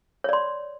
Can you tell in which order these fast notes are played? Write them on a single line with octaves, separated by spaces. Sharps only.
C#5 D5 C6